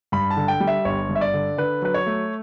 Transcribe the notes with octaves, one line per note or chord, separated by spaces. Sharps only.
G2 B5
A5
D3
G5
G3
E5
G1 C#5
G2
E5
D5
D3
D3 B4
F#3 B4
C#5
A3